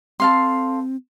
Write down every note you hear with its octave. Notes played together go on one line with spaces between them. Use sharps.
C4 A4 F5 C6